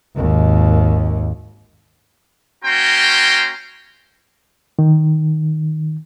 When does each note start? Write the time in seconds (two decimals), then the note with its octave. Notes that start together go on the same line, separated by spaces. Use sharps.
0.16 G#1 D#2
2.65 A#3 C#4 F#4 G5 A#5 C6
4.79 D#3